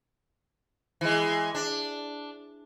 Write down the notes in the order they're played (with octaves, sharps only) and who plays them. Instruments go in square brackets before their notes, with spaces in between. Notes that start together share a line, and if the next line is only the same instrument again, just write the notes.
[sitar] E3 G#3
D4